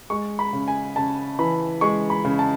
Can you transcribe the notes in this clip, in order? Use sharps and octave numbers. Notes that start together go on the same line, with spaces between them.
G#3 C#6
B5
C#3
G#5
C#3 A5
E3 B5
G#3 C#6
B5
C#3
A5